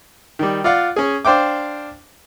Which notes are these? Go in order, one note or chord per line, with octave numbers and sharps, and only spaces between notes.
D#3 G3
F4 D5 F5 F#5
C#4 G#4
D4 C5 F5 G5 D6